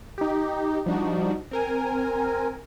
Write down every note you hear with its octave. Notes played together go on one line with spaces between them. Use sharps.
D#4 G4
F3 G3 D4 D#4 F#4
C4 A#4 G#5